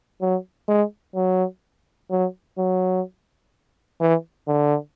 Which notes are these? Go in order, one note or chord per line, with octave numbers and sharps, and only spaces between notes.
F#3
G#3
F#3
F#3
F#3
E3
D3